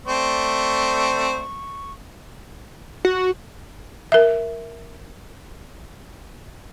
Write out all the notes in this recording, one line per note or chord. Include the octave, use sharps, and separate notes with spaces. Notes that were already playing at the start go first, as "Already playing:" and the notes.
A3 C4 D5 C#6
F#4
A#4 E5